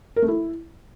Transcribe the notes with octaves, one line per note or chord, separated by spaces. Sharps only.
A#4
A3
E4